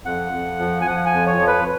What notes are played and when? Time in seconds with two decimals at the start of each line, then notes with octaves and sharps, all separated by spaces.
0.04 F2 F#5
0.32 F2
0.59 F3
0.81 G#5
0.86 F3 F#5
1.06 G#5
1.13 F2
1.26 C#5
1.41 F3
1.47 B4